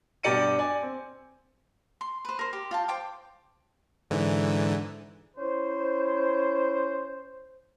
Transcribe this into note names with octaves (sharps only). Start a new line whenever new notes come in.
G2 B2 G4 D5 C#7 D#7
D5 G#5
C4
C6
B4 C5
A#4 C5
G4 C6
F4 G5 A5
C5 G5 D6
G#2 D3 E3
C#4 E4 C5